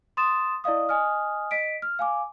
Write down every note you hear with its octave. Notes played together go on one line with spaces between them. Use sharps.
C6 D#6 A6 E7
E4 D5 D#5 F5 D#6
D#5 G#5 D#6 F6
D#5 B6 D7
F6
F5 G#5 D6